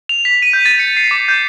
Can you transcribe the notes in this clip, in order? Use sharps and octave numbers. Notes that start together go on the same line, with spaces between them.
F7
B6
D#7
G6
A6
C#7
C7
D6
G6